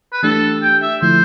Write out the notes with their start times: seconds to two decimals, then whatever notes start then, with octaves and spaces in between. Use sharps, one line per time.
0.12 B4
0.23 E3 A3 D4 G4 A4
0.62 G5
0.82 E5
1.02 D3 F3 A3 E4 C5